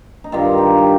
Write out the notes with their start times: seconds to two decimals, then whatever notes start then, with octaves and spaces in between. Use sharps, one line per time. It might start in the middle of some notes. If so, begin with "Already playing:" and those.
0.24 D#4
0.32 G2 D#3 F4
0.58 G4
0.78 G4